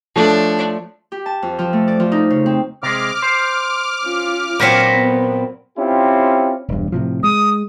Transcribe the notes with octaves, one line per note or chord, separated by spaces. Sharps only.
F3 A3 D4 C#5
G4
A5
F2
F3
A3
D5
F3
D#4
C#3
C4
C3 G#3 D6 F6
C5
C#4 F4
A#2 F#3 C4 A#4 B4 F#5
B3
C4 C#4 E4 F4 G4
E1 G2
A2 C3 F3
G#3 D#6